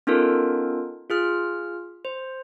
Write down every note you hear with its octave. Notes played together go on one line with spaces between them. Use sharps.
B3 C#4 D#4 F4 A4 A#4
F4 G#4 F6
C5